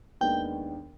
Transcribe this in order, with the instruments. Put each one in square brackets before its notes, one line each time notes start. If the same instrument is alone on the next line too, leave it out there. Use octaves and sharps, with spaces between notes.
[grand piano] D#2 D#3 G#3 B3 D4 [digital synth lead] G5